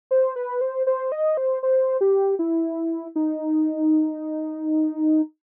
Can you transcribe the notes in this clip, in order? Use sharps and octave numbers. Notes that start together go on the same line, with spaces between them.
C5
B4
C5
C5
D#5
C5
C5
G4
E4
D#4